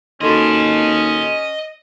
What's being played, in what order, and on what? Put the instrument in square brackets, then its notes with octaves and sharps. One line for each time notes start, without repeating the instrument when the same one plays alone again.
[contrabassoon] D#2 [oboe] C#4 [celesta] F#4 A4 C6 [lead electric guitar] D#5 A5